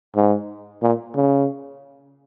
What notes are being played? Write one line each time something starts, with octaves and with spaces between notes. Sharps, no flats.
G#2
A#2
C#3